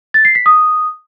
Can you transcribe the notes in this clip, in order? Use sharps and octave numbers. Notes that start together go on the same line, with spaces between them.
A6
C7
B6
D#6